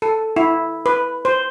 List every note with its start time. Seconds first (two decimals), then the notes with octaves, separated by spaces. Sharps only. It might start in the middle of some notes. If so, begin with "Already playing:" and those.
0.02 A4
0.36 E4
0.86 B4
1.25 C5